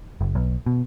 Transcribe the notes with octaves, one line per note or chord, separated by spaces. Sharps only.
F#1
B1
B2